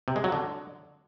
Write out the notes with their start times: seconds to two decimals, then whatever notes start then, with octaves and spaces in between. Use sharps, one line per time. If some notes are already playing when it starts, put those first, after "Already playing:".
0.08 C3
0.16 G#3
0.24 F#3
0.32 D3